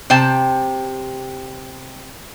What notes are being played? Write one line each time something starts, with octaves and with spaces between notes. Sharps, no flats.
C3 C5 G5 A5